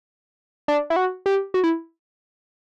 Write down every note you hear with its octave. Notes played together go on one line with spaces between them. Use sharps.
D4
E4
F#4
G4
F#4
E4